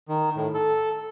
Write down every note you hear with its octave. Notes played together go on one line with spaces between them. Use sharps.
D#3
A2
A4